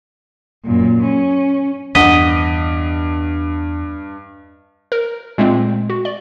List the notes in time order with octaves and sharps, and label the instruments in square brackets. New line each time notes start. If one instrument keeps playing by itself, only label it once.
[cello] F#2 A#2
C#4
[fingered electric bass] E2 [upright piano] G2 [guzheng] D#5 [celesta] F#5 B6
[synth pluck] A#4
A#2 G#3 A3 C4
F#4
D5